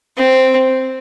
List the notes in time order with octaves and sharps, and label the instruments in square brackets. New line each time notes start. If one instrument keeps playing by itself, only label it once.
[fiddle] C4